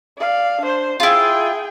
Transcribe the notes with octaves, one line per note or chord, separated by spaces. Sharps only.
D5 F5
D4 C5
E4 F4 G#4 G5